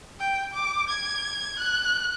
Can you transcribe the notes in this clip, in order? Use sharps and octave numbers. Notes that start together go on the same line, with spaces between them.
G5
D6
G#6
F#6